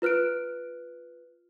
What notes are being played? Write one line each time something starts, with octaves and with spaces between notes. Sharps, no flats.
F4 B4 F6 F#6 D7